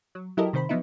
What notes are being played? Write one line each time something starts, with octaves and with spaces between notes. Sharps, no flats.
F#3
F#3 E4 G4 A4 A#4 D#5
C3 D#3 C5 B5
F3 F#3 B3 D#4 E4